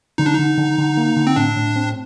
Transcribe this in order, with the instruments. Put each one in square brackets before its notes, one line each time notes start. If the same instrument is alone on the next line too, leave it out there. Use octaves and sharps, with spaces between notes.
[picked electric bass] D3 [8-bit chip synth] D#4
[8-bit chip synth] D4
[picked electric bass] D3 [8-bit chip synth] D#4
[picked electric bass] D3
D3
A#3
D3
[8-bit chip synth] C4
[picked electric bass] A2 [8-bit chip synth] D4
[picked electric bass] A2
C4